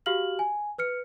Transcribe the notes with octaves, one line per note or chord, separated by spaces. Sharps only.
F#4 G4 F5 F6 F#7
G#5
B4 F6 C#7